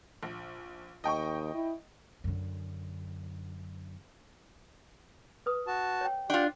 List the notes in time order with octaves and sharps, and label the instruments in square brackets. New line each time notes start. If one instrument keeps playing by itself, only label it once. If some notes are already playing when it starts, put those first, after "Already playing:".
[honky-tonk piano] A#1
[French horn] D#2 [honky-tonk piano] D#5 G5 C#6
[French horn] E4
[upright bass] F#2 D3
[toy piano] B4 D#6
[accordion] F#4 A5
[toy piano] C#5 G5
[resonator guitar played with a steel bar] D4 F4 [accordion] G4 F#5